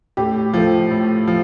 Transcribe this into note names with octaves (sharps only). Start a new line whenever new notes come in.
A2 G4
F3 A3
A2
F3